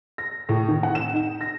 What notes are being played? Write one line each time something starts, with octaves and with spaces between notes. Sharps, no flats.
A#6
A2
D#3
F#5
E7
D#4
A#6